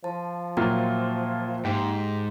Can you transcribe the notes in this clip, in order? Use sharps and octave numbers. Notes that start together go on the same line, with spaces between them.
F3 A5
A#2 F#3 A#3 F4 E5 G5
G#2 G4